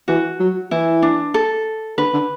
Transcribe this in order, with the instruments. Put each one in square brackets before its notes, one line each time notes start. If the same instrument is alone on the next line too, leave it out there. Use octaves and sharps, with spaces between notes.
[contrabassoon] E3 [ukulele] F#4
[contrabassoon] F#3
[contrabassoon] E3 [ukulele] E4
[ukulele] D4
A4
[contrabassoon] D3 [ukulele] B4
[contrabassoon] D3